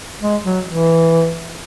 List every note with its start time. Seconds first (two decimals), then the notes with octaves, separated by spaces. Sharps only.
0.21 G#3
0.44 F#3
0.66 E3